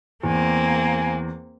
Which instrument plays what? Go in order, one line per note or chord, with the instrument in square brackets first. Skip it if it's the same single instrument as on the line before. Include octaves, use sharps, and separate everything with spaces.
[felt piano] E2 [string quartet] A#3 C4 [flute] G#5